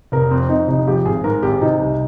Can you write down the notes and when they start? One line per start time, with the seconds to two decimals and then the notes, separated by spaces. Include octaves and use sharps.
0.12 F1 A#4
0.31 F2 C4
0.49 F2 D#4
0.68 F1 D#4
0.87 F3 G4
1.05 G#1 G#4
1.24 G#2 A#4
1.43 G#1 G4
1.61 C3 D#4
1.80 C2